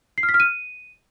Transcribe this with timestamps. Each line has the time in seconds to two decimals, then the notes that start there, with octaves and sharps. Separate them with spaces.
0.18 C7
0.23 F6
0.29 B6
0.34 F6
0.40 D#7